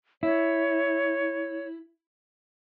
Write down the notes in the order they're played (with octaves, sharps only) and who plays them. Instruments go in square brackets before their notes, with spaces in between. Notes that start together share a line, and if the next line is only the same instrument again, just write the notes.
[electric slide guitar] E4 [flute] C#5